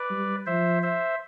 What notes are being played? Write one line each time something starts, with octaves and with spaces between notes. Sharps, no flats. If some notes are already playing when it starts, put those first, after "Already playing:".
Already playing: B4 D5
G3
F3 C5 E5
C5 E5